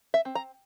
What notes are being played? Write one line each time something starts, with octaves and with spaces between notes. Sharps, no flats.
E5
C4
A#5